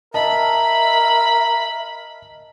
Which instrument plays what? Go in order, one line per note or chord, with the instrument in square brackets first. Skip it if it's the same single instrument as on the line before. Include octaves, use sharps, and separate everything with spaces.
[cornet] A#4 [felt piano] D#5 A5 [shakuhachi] E5 [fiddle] B5